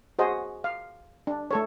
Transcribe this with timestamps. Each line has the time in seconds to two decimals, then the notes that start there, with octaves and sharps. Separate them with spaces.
0.19 F#4 G#4 C5 D#5
0.64 F5
1.27 D4
1.51 A3 A4 C#5